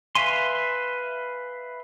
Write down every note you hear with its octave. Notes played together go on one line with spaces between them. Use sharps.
B4 E5 F5 G#5 C6